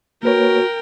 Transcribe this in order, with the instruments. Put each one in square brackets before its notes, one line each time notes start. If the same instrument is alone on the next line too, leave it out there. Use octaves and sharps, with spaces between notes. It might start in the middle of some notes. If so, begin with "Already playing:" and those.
[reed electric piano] A#3 B4 C#5 [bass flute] F#4 [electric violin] A#4 G5